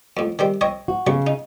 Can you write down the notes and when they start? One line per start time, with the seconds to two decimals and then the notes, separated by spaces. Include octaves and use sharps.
0.17 F2 A2
0.39 D#3 G3 C4
0.61 C4 C#5 D#5
0.88 F#4
1.07 B1 C#3 F#3 C#6
1.27 D#4